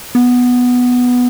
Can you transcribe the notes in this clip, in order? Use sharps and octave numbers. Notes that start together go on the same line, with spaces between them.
B3